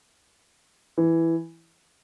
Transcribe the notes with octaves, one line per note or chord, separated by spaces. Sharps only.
E3